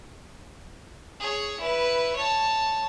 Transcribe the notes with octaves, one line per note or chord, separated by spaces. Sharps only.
G#4 C#5
E4 B4
C#5 A5